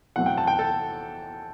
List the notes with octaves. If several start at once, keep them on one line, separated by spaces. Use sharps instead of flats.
E2 B2 F#3 A3 C4 F#5
G5
A5
G5
A4